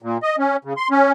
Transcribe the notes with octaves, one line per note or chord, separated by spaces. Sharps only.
A#2
D#5
C#4
C#3
C6
C#4